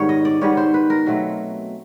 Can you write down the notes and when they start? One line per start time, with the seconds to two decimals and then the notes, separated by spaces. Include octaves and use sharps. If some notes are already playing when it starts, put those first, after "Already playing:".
Already playing: G#2 D#3 G3 B3 C#5
0.09 D#5
0.25 D5
0.41 G#2 D#3 G3 B3 C#5
0.57 C5
0.74 B4
0.90 A#4
1.06 B2 F#3 A3 C4